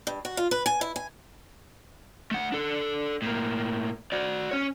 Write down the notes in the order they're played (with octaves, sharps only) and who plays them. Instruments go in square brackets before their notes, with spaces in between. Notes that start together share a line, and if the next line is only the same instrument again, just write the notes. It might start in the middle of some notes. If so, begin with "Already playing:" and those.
[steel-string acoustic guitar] G2
F#4
F4
B4
G#5
E4
G#5
[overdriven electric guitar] A3 F#5
D4 A4
A2 A#3
F#4 D5
C#4 C#5